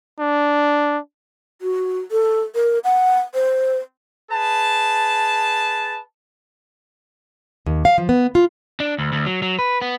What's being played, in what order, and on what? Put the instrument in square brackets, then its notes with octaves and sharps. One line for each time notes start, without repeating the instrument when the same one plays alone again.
[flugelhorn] D4
[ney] F#4
A4
A#4
F#5
C5
[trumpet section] G#4 B4 A5
[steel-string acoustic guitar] D#2
F5
F3
B3
F4
[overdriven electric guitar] D4
D2
D2
F#3
F#3
B4
B3